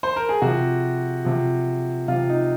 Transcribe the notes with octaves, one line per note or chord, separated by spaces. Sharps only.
C5
A#4
G#4
C3 F3 F#4
C3 F3
C3 F4
F3
D#4